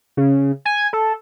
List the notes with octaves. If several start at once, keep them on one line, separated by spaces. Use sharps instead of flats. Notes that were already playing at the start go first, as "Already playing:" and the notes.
C#3
G#5
A4